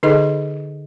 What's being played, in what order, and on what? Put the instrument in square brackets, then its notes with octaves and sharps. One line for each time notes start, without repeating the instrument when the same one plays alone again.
[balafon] D3 D#4 G#4 A4 D#5